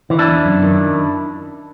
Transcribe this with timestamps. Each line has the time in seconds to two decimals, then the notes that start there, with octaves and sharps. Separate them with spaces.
0.10 E3
0.19 D4 E4
0.27 E2
0.45 F#2
0.62 D#3